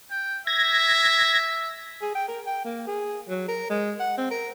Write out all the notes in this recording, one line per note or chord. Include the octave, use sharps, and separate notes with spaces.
G5
E5 G#6 A#6
G#4
G5
A#4
G5
A#3
G#4
F#3
A#4
G#3
F#5
C4
A#4